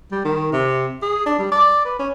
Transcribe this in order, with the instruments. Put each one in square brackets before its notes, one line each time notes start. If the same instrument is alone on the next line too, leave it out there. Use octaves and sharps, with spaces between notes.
[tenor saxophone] G3
D#3
C3
G#4
D4
G3
D5
B4
C#4